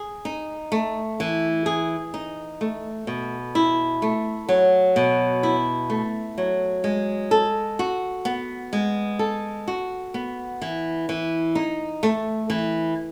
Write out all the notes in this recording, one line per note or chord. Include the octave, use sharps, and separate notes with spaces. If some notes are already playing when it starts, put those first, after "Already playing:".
Already playing: G#4
D#4
A3
E3
G#4
D#4
A3
B2
E4
A3
F#3
B2
E4
A3
F#3
G#3
A4
F#4
B3
G#3
A4
F#4
B3
E3
E3
D#4
A3
E3